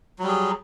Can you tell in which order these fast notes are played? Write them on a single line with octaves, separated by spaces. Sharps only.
F#3 G3 G#4